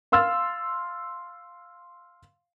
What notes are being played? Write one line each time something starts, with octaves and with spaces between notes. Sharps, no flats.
F5 C6 E6 F6 A6